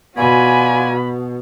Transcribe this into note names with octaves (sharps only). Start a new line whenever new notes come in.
B2 F4 F#4 D5 G#5 B5